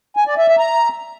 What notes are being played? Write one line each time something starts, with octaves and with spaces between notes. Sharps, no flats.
G#5
D5
E5
E5
A#5